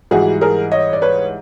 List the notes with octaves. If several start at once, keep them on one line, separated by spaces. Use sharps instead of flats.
G#2 E3 G3 F#4 G#4
G#4 A#4
C#5 D#5
D5
B4 C#5